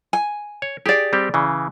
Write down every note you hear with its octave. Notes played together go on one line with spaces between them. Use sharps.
G#5
C#5
G4 G#4 D5
G3 C4 G4
C#3 E3